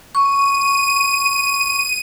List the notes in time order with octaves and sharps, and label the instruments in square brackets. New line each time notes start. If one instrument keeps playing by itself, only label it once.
[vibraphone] C#6 [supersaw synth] D#7